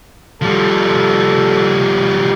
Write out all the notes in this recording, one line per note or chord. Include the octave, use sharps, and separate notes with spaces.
F3 G3 A4